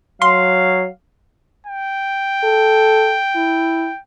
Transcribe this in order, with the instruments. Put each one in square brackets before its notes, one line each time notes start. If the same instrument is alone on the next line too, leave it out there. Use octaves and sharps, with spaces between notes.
[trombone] F#3 [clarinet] F5 [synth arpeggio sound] C6
[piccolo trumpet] G5
[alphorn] A4
E4